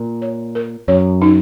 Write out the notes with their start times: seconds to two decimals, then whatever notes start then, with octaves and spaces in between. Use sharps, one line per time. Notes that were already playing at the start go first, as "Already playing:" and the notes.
Already playing: A#2
0.22 C#5
0.55 A#4
0.88 F#2 C#5
1.22 D#4